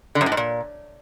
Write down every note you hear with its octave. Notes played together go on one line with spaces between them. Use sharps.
D3
F#2
A2
G#2
A#2